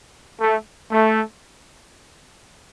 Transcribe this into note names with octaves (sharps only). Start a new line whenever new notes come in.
A3
A3